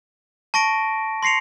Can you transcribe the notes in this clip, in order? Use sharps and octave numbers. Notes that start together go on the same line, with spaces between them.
A5 C#6 A#6 D7
C6 A#6 C7 C#7 F7